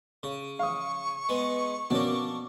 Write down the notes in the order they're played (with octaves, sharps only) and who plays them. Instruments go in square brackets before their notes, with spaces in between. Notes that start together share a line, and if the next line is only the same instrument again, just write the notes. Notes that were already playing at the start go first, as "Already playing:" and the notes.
[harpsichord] C#3
[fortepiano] F5 D#6 [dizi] C#6
[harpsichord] G#3 B3
[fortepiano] B2 C#4 [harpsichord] A#3 D4